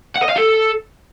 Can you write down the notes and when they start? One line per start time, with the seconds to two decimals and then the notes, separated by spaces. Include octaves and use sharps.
0.16 F#5
0.22 D#5
0.29 F5
0.36 A4